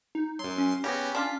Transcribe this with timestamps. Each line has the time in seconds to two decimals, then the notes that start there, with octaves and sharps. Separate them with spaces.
0.15 D#4
0.39 F#2 F#3 C6
0.58 C#4
0.84 C#3 B3 C#4 G4 A#6
1.15 C#4 D4 F4 B6